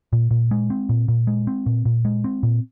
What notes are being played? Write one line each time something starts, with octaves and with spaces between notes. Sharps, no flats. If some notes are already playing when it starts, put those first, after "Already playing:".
A#2
A#2
G#3
C4
A#2
A#2
G#3
C4
A#2
A#2
G#3
C4
A#2